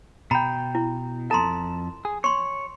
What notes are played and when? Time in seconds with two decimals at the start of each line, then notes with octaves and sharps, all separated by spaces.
0.31 B2 G5 A#5 B5
0.75 E4
1.31 F2 A4 A5 A#5 C6
2.05 G#4
2.24 C#5 C6 C#6